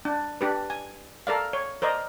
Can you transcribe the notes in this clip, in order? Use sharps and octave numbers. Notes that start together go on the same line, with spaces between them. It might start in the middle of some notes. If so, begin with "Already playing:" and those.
D4
D4 G4 B4
G#5
A4 A#4 D5 F5
C#5
A#4 C5 D5 D#5